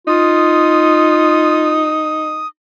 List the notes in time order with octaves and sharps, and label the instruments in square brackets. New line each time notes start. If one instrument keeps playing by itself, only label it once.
[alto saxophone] D#4 [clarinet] F4 [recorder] D#6